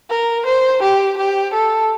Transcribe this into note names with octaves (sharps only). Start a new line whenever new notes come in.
A#4
C5
G4
G4
A4